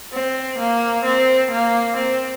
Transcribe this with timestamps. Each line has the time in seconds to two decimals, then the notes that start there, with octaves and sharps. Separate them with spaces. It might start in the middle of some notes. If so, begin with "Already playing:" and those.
0.12 C4
0.58 A#3
1.04 C4
1.51 A#3
1.96 C4